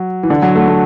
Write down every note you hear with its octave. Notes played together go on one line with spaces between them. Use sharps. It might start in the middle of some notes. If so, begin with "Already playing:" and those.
Already playing: F#3
E3
D3
F#3
A3
A3